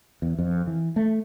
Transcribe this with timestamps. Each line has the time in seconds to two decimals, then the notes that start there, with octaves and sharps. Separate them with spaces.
0.22 E2
0.39 F2
0.67 E3
0.96 A3